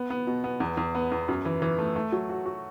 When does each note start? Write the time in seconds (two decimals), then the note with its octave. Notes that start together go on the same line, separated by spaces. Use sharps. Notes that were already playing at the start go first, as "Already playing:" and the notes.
Already playing: B3
0.10 B3
0.27 B2
0.44 B3
0.60 E2
0.77 E2
0.95 B3
1.12 E2
1.28 F#2
1.45 E3
1.62 E3
1.79 A3
1.96 A3
2.12 F#3
2.30 F#4
2.46 F#4